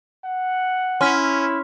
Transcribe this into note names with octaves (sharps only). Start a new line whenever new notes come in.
F#5
C#4 E4 C6 F6 B6